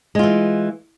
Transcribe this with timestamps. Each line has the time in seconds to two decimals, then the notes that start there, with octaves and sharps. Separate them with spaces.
0.15 G#3
0.19 F4
0.23 E3